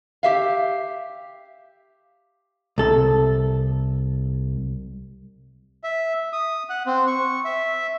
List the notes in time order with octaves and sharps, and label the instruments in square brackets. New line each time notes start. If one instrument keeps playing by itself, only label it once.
[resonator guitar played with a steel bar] G4 E5 F5
[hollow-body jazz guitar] C2 A4
[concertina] E5
D#6
F#5
C4
C#6
E5